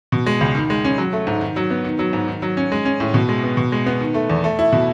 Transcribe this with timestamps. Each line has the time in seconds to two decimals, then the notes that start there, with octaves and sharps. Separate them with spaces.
0.12 B2
0.26 G#3
0.41 C#2
0.55 D#3
0.70 G#3
0.85 C#4
0.98 F#3
1.13 A3
1.27 G#2
1.41 D#3
1.56 F#3
1.70 B3
1.84 D#3
1.99 F#3
2.13 G#2
2.28 D#3
2.42 F#3
2.57 C#4
2.72 G#3
2.85 C#4
3.00 A2
3.14 B2
3.29 G#3
3.44 B3
3.57 B2
3.72 G#3
3.86 B3
4.01 D#3
4.14 A3
4.29 E2
4.44 A3
4.59 E4
4.72 B2